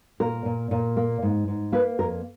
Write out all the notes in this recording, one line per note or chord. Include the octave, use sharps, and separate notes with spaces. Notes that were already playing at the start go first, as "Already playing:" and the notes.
A#2 A#4
A#2
A#2
A#3
G#2
G#2
A#3 B4
F2 A#4